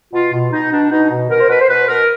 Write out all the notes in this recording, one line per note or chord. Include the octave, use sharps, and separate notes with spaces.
B2 F4
B2
B2 D#4
B2 D4
B2 D#4
B2
B2 A#4
C5
B2 B4
C5
B2 B4
B2 A#4